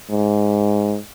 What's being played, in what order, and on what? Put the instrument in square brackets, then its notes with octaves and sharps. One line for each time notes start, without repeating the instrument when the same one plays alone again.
[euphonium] G#2